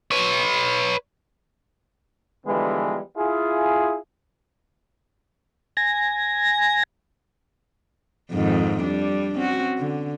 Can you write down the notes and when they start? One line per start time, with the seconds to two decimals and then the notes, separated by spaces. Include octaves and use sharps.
0.11 B4 C#5
2.46 D3 E3 F3 G3 G#3 B3
3.16 E4 F4 G#4
5.77 G#5 A#6
8.32 F2 G#2 D#3
8.83 G3 D4
9.36 C4 C#4 F#4
9.78 D3